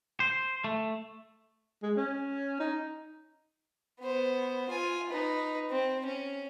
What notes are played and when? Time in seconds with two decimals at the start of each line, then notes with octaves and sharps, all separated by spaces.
0.20 C5
0.64 A3
1.82 G#3
1.97 C#4
2.60 D#4
4.01 B3 C5
4.70 F4 G#5
5.09 D#4 B4
5.70 C4
6.05 C#4